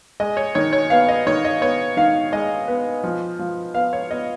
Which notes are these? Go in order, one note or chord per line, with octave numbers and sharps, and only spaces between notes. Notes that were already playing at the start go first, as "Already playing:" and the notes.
G#3 D#5
C#5
D#3 C#5
C#5
B3 F5
D#5
D#3 C#5
D#5
B3 C#5
D#3 F5
G#3 D#5
B3
F3
F3
B3 F5
C#5
B3 D#5